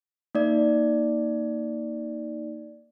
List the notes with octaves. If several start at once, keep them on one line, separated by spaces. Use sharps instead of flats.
A#3 D#4 D5